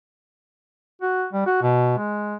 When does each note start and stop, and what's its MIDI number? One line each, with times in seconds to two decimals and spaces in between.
1.01 1.26 66
1.33 1.45 55
1.46 1.60 66
1.62 1.96 47
1.97 2.35 56